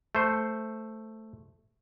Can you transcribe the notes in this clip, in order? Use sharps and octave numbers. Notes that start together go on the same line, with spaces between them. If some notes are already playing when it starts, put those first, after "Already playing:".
A3 C5